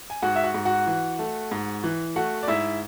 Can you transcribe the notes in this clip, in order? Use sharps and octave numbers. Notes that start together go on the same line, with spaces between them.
G#5
G#2 F#4 F#5
E5
F#4 F#5
G#2
F#4 F#5
E3
A3
G#2
E3
A3 F#4 F#5
D5
G#2 E4 E5